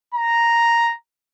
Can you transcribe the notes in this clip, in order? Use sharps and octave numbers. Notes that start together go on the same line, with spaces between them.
A#5